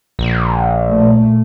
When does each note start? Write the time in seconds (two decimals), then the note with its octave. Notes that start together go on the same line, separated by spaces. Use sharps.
0.19 A#1
0.87 A#2 A3